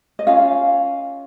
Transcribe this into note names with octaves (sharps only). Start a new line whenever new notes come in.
D#5
C#4 F4 F5